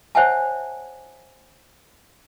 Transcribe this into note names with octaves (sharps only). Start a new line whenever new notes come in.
C5 C#5 E5 F#5 G#5 A5